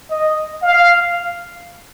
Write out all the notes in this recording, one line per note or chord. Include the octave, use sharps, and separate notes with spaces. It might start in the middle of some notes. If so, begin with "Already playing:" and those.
D#5
F5